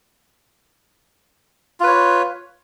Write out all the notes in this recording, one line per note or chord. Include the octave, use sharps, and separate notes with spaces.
F4 B4 C#5